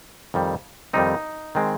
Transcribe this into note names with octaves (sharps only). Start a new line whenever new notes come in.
F2 D#3 G3
F2 D#3 G3 C4 D#4
D#3 G#3 C4